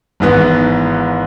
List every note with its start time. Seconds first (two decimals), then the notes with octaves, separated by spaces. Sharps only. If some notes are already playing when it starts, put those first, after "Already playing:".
0.20 G#1 G#2 E3 B3